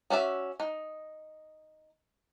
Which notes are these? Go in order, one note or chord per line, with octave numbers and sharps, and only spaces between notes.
C#4 F#4 D5 E5
D#4